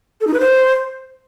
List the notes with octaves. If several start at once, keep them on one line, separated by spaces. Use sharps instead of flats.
A4
D#4
B4
C5